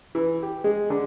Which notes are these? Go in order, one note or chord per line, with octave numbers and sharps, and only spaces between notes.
E3
G4
G#3
D3